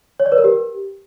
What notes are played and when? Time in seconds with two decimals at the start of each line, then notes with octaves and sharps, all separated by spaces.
0.20 C#5
0.26 D5
0.32 B4
0.38 A#4
0.44 G4